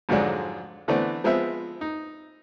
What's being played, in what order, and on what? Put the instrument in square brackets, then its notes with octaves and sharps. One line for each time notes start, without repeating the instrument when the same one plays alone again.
[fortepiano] F2 G#2 D3 F#3 G#3 D4
D3 E3 A3 B3 C4 D4
F3 G#3 B3 C4 E5
D#4